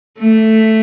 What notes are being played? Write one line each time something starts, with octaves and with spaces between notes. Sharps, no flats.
A3